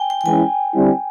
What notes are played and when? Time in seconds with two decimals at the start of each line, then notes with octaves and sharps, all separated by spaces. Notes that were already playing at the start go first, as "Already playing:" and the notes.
Already playing: G5 G#5
0.10 G5
0.21 G5
0.25 E3 G#3 C#4 E4 G#5
0.73 D3 G3 C4 E4